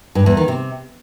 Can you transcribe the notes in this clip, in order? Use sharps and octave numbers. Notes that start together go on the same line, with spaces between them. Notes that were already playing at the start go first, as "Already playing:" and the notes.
G2
E2
D#3
C3